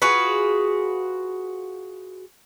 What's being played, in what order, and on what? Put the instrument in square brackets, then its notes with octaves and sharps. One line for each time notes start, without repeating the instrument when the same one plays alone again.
[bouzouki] F4 F#4 G#4 B4